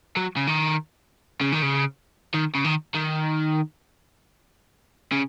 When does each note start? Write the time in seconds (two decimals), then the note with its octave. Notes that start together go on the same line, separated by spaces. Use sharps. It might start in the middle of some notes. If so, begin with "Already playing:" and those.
0.17 F#3
0.37 C#3
0.47 D#3
1.41 C#3
1.52 D#3
1.62 C#3
2.34 D#3
2.55 C#3
2.65 D#3
2.95 D#3
5.12 C#3